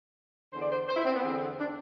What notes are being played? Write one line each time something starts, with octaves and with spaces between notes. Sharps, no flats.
E2 D3 C5
D5
C5
C5
E4
C4
B3
E2 D3 C4
D4